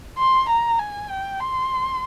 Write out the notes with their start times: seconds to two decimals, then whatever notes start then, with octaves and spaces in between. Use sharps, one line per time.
0.18 C6
0.49 A#5
0.79 G#5
1.10 G5
1.40 C6